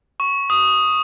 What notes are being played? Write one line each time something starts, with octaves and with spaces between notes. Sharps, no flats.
C#6
D#6